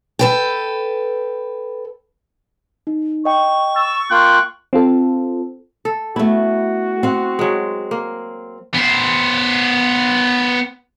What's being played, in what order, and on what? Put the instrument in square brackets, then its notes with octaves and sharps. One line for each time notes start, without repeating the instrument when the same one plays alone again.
[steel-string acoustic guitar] A4 B4 G5
[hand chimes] D#4
[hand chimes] D#5 G5 [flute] C#6
[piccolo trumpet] E6 [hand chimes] A6
[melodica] A#3 F4 G5 [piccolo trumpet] F#6
[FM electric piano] C4 F4 A4
[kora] A4
[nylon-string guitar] A3 B3 [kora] E4 [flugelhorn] F#4
[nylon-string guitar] C4 F#5
[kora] F#3 G#3
A#3
[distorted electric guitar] B3 C5